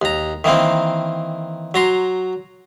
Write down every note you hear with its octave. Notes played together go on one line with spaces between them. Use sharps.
D#2 A#5
D#3 E3 A#3 C4
F#3 A#5 C6